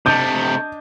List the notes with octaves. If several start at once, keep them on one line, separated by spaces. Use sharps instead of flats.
C3 A3 D4 D#5 G6